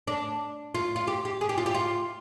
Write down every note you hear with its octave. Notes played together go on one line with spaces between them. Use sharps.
D4
F4
F4
G4
G4
G#4
G4
F4
G4
F4